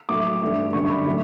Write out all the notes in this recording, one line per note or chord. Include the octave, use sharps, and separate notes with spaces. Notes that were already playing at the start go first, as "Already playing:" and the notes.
A2 F#3 A3 D6
G2 E3 A3
F#2 D3 G3 C#6
B5
A2 F#3 A3